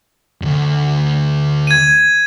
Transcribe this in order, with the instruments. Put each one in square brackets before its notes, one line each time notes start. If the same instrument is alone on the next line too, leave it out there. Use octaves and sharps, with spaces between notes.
[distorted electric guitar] D2 G2
[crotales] G#6 D#7